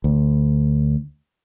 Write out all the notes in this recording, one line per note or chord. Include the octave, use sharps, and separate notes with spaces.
D2